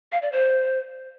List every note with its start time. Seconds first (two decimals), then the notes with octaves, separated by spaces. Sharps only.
0.12 F5
0.22 D5
0.32 C5